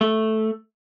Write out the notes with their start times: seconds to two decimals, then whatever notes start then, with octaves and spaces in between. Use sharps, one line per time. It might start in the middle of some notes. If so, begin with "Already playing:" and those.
0.01 A3